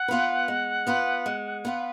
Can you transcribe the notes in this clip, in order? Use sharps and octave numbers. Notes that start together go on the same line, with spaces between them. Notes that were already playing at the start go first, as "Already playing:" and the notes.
Already playing: F#5
B3 F4 B4
G#3
B3 F4 B4
G#3
B3 F4 B4